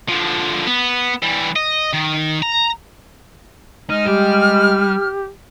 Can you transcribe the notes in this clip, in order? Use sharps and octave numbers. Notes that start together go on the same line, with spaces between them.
D3 F3
B3
E3 G3
D#5
D#3
A#5
G#3 D#4 F6
G3 G4